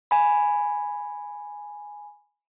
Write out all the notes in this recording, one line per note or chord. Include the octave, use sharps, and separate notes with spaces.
G#5 B5